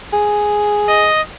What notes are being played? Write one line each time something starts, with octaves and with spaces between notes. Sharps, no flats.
G#4
D#5